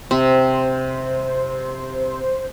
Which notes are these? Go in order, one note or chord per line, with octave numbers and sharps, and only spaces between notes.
C3 C5